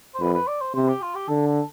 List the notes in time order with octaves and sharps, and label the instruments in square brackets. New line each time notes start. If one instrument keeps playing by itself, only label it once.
[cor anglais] C5
[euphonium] F2 [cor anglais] B4
[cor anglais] B4
D5
C5
[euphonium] C3 [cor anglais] C5
[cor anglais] G4
F4
G4
[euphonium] D3 [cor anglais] A4
[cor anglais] A4